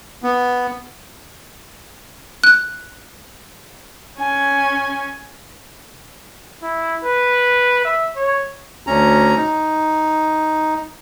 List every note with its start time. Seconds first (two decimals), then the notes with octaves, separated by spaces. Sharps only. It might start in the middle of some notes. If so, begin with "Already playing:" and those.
0.24 B3
2.44 F#6
4.18 C#4 G#5
6.63 E4
7.05 B4
7.85 E5
8.16 C#5
8.87 D2 C#4 A#5
9.37 D#4